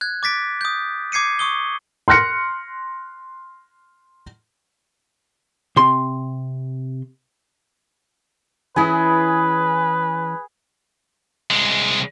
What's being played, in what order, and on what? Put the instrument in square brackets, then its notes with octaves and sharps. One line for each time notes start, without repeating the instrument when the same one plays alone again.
[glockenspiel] F#6 G#6
D6 A6 B6 D7
D#6 G6
D6 G#6 C7 C#7 D#7
C#6 D#6 G7
[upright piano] C6 F6 F#6 A#6 C#7
[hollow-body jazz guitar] C3 C6
[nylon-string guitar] E3 C#4 E4 [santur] G#4 [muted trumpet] B4
[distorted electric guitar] C2 G#3